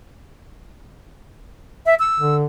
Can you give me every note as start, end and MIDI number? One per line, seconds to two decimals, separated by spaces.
1.86 1.95 76
1.99 2.35 88
2.20 2.46 50